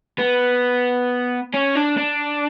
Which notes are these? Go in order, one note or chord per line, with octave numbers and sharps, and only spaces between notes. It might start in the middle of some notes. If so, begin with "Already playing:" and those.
B3
C#4
D4
D4